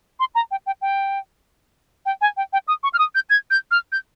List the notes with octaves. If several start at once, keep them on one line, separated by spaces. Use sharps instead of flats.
C6
A#5
G5
G5
G5
G5
G#5
G5
G5
D#6
C#6
F6
D#6
G6
G#6
G6
F6
G6